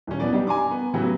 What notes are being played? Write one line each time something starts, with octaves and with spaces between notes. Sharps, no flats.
D#1 C#4
B2 E3 B3 D5
G3 D4 D#4 G4
G#5 A#5 C6 D6
B3
A2 C#3 E3 F#3 B3 G4